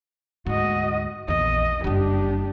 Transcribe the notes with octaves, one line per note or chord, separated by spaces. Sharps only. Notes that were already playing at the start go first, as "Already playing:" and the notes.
D2 G#2 F#4 D#5
A#1 E2 D#5
F#1 G2 D4 G4